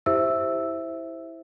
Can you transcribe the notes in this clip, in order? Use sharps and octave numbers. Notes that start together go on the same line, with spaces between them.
E4 G4 C5 E5 E6